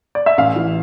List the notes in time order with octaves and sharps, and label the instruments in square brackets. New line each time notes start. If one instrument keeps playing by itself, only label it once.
[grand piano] D5
E5
A1 F5
E3